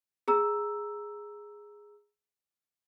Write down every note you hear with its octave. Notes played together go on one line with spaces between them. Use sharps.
G#4 A#5 E6